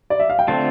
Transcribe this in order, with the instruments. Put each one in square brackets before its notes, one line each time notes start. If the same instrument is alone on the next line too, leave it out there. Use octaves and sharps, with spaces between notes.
[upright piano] D5
E5
F5
G5
[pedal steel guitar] D3 A3 C4 F4 [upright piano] A5